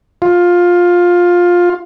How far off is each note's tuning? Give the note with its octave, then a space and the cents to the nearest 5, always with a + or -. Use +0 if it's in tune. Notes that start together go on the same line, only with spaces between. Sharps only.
F4 +15